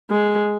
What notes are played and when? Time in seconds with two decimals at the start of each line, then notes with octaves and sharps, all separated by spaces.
0.10 G#3